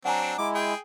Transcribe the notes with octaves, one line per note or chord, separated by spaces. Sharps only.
F#3 C4 D4 F#5 G#5 A#5
G#3 E4 D6
G#4 G5